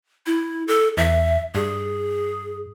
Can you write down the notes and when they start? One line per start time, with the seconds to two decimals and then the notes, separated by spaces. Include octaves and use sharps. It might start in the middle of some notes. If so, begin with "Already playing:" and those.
0.26 E4
0.68 A4
0.97 E2 E5
1.55 G2 G#4